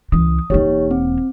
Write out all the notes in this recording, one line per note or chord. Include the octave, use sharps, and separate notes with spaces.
C#2 E3 D#6
E1 A#3 D#4 G4 C#5
C4